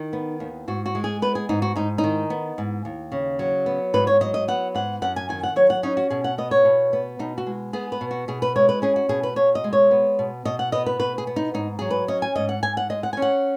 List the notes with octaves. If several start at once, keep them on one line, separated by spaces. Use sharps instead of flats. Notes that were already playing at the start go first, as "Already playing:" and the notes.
Already playing: D#3 D#4
B3
D#2
G#2 F#4
F#4
G#3
G#4
B3 B4
G#4
G#2 D#4
F#4
G#2 D#4
D#4
D#3
B3
G#2
D#2
C#3
F#3
B3
G#2 B4
C#5
F#3 D#5
D#5
B3 F#5
G#2 F#5
F#2 F#5
G#5
D#3 G#5
F#5
F#3 C#5
F#5
C#4 D#4
F#4
B2 G#4
F#5
B3 D#5
C#5
B2
B3
B2 D#4
F#4
G#3
B3 G#4
B4
B2
F#4
B2 G#4
B4
G#3 C#5
B4
C#4 G#4
F#4
B2 G#4
B4
B2 C#5
D#5
G#3
C#5
B3
B2
B2 D#5
F#5
B3 D#5
B4
B2 B4
G#4
B3
D#4
G#2 D#4
F#3 G#4
B4
C#4 D#5
G#5
G#2 D#5
F#5
G#2 G#5
F#5
G#3 D#5
F#5
G#5
C#4
F#5